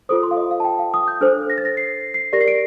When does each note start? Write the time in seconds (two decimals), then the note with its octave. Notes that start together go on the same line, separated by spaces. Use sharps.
0.09 F4 A4 C5 D#6
0.23 C6
0.31 F5
0.37 D#5
0.51 F5
0.60 A5
0.65 G5
0.79 F5
0.94 D#6
1.08 G6
1.21 D4 A4 C5 F6
1.50 A#6
1.58 A6
1.65 A#6
1.77 C7
2.14 C7
2.33 G4 A#4 D5 A#6
2.41 C7
2.48 D7